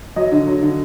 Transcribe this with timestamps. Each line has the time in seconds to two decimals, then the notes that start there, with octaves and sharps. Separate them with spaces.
0.16 F#3 D#5
0.32 D3
0.47 F#3
0.63 D3